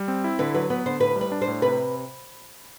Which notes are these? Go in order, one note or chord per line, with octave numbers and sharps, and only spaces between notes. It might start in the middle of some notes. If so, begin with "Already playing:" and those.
Already playing: G3
C4
E4
D3 B4
F#3 B4
B3 B4
D3 C5
A2 B4
G3
B4
D4
C5
A2
C3 B4